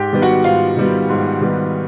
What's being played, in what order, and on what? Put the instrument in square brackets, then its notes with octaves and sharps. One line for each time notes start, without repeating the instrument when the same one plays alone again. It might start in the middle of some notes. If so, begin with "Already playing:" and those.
Already playing: [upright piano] G#2 G4 G5
D#3 G3 B3
F#4 F#5
G#2 F4 F5
D#3 G3 B3
G#2
D#3 G3 B3